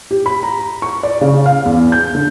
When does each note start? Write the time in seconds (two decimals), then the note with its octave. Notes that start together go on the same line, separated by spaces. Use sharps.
0.11 G4
0.26 B5
0.43 A#5
0.82 C#6
1.03 D5
1.21 C#3
1.46 F5
1.66 E2
1.92 G6
2.15 D3